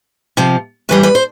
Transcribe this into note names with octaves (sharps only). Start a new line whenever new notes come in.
C3 F3
A2 E3 G3 B4
B4
C5